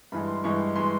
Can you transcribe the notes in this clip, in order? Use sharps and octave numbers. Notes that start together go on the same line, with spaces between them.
G2 E3 G#3 B5
C6
G2 E3 G#3 C#6
E3 G#3 C6